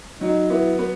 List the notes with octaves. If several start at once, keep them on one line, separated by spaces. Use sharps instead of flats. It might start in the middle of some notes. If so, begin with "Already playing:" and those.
F#3 D#4
B3 E4
B3